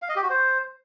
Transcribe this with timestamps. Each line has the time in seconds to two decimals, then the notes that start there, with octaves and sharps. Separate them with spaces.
0.02 F5
0.09 D#5
0.16 G4
0.23 F#4
0.30 C5